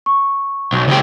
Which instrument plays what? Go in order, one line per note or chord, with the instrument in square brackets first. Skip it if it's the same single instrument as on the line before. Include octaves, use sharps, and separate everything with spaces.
[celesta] C#6
[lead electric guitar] B1
C#2 G4